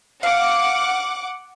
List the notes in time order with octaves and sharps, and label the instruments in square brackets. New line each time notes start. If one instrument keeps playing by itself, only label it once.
[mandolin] F5 [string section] F#5 D6